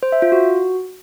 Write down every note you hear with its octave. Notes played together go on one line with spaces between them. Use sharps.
C5
E5
F4
F#4